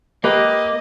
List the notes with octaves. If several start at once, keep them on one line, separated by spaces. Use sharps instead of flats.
A#3 G4 B4 D#5 D6